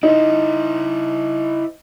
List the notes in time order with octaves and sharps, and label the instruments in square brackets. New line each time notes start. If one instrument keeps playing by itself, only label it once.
[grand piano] D#4 [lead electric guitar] E4 C5